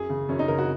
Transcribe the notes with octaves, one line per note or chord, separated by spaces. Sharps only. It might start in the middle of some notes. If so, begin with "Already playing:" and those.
Already playing: F#2 G#4
C#3
F#2 C#4
D#4
C#3 A#4
F#4